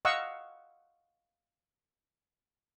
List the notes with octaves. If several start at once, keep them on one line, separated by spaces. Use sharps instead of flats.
D#5 F5 F#5 C#6 E6